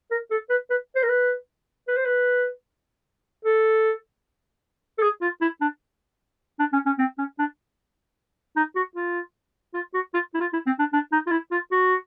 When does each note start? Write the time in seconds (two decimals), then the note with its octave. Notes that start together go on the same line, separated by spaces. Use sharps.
0.11 A#4
0.31 A4
0.50 B4
0.70 B4
0.95 C5
1.03 A#4
1.08 B4
1.88 B4
1.97 C5
2.06 B4
3.45 A4
4.98 A4
5.02 G#4
5.21 F4
5.41 E4
5.61 D4
6.59 D4
6.73 C#4
6.86 C#4
6.98 C4
7.18 C#4
7.38 D4
8.56 D#4
8.76 F#4
8.95 F4
9.74 F4
9.94 F#4
10.14 F4
10.34 E4
10.40 F4
10.53 E4
10.66 C4
10.79 D4
10.93 D4
11.12 D#4
11.27 F4
11.31 E4
11.51 F4
11.71 F#4